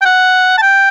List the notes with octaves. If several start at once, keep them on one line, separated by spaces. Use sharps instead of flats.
G5
F#5
A5
G5